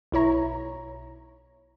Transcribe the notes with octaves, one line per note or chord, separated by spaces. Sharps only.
B1 E4 C#5 A#5